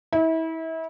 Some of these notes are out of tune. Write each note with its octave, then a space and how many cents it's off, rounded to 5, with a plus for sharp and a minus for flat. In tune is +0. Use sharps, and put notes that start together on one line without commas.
E4 -30